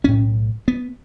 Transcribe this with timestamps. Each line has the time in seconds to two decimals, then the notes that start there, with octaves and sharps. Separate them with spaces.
0.04 B1 A2 C#4
0.68 B3